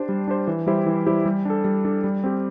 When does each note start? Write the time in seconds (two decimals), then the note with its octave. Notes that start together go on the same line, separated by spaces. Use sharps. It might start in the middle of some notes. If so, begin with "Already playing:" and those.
Already playing: D4 G4 C5
0.09 G3
0.28 D4 G4 C5
0.47 E3
0.66 G3 E4 G4 C5
0.87 E3
1.06 G3 E4 G4 C5
1.26 G3
1.45 D4 A4
1.64 G3
1.85 D4 A4
2.04 G3
2.24 C4 G4